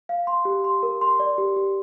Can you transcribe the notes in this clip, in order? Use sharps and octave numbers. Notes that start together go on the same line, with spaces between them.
F5
C6
G4
C6
A#4
C6
D5
G4
G4